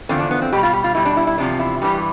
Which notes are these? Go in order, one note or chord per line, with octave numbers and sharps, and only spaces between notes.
E2 D3 F3 C4
D4
B3
C4
B2 G3 G4
F4
G4
F4
B2 G3 E4
D4
E4
E4
E2 C3 F3 D4
E4
G2 E3 G3 G4